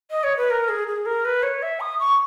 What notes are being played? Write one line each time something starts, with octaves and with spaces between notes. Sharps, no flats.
D#5
C#5
B4
A#4
G#4
G#4
A#4
B4
C#5
E5
D#6
C#6